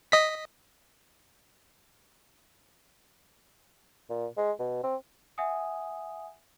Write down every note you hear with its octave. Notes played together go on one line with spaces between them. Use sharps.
D#5 B6
A#2
G#3
B2
C4
E5 F#5 G#5 D#6